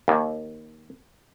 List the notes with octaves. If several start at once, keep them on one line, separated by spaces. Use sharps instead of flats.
D#2